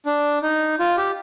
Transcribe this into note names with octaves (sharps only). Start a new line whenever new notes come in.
D4
D#4
F4
G4